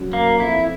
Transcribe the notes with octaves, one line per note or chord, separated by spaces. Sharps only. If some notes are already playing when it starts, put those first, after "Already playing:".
Already playing: F#2
A#3
F2 E4